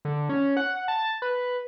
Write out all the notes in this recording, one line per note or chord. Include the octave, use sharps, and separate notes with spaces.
D3
C#4
F#5
A5
B4